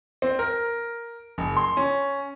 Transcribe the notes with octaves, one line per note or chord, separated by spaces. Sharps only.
C4
A#4
F#1
C6
C#4